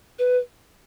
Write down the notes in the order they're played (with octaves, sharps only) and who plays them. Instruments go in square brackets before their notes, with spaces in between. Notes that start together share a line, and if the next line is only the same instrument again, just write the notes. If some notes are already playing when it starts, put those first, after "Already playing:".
[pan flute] B4